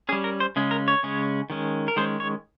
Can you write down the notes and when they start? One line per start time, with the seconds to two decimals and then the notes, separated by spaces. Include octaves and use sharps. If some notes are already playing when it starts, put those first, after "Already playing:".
0.09 C#4 G#4
0.12 G3
0.24 A#4
0.40 C5
0.56 C#3 G#3 C#4
0.71 A#4
0.88 C#5
1.03 C#3 G#3 C#4
1.50 D#3 G#3 C#4
1.88 A#4
1.96 D#3 G#3 C#4 C5
2.20 C#5